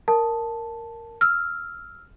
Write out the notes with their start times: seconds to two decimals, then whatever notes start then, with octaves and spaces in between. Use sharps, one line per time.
0.08 A#4 A5
1.21 E6 F6